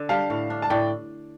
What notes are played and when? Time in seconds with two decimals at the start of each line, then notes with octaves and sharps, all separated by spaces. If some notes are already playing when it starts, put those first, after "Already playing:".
Already playing: D3 D4 A4
0.09 G3 F5 A5
0.30 A2
0.50 D4
0.62 A5
0.70 A2 D5 G5